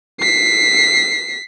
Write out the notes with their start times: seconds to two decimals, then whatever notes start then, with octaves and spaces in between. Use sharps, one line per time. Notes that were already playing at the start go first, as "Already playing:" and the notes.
0.20 B6 C7